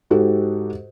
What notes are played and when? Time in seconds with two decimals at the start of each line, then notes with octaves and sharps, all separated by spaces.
0.10 G#2 F#4 G4 A4